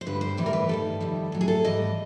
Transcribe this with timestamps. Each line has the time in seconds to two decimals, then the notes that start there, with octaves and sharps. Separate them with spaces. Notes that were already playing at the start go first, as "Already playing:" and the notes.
0.01 C5
0.06 G2 D3 G3 B4
0.21 C5
0.37 A2 E3 G3 B4
0.46 A#4
0.53 B4
0.69 G2 D#3 G3 A4
1.00 F2 C3 D#3 G3
1.32 A2 F#3
1.41 G#4
1.48 A4
1.64 G#2 E3 G3 D#5